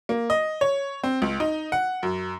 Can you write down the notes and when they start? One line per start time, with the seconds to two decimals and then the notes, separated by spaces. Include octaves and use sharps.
0.09 A#3
0.30 D#5
0.61 C#5
1.03 C4
1.22 C#2
1.40 D#4
1.72 F#5
2.03 F#2